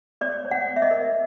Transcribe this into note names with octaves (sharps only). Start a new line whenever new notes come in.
C#5 D5
C#5
F#5
C#5
E5
D#5
A#4